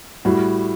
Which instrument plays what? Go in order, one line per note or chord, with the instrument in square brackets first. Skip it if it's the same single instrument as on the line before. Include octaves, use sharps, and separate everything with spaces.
[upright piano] A2 G3 F#4